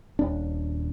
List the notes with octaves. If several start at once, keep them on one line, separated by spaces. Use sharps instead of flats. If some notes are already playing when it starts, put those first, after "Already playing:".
D#1 D4